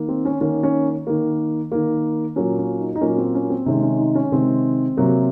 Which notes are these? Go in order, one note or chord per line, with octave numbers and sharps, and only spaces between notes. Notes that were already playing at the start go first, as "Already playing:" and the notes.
Already playing: D#3 A#3
C4
C#4
D#3 A#3 C#4
C#4
D#3 A#3
D#3 A#3
A#2 F#3 A#3 C#4
C#4
D#4
D#4
A#2 F#3 A#3 C#4
C4
C#4
C4
C3 D#3 G#3 C#4
D#4
C#4
D#4
C#4
C3 D#3 G#3 C4
C3 F#3 A#3